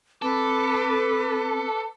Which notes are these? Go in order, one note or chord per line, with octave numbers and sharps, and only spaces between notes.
C4 A4 B4 D6